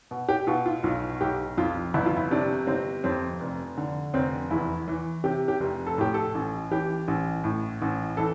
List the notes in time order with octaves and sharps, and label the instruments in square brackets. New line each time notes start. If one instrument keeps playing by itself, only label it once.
[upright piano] B2
G4
B2 F4
F4
B1 F4
B1 G4
F2 F4
G1 E4
F4
E4
C3 D4
G1 C4
F2 C4
F1
D3
F1 C4
E2 E4
E3
C3 G4
G4
F1
A4
A2 G4
A4
A1
E3 G4
A1
A2
A1
E3 A4